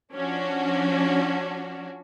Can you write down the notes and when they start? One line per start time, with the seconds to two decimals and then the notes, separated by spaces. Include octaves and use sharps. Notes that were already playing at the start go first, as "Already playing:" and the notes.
0.13 F3 C#4 D4 F#4